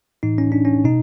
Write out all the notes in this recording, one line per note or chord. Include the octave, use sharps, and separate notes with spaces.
A2 E3 D#4
C#4
D4
C#4
B2 D#4